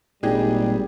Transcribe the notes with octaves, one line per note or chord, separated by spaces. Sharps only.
G#1 A#2 G3 D4 D#4 G4 G#4